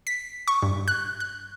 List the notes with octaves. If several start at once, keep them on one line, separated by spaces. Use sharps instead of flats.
B6
C#6
G2
F#6
F#6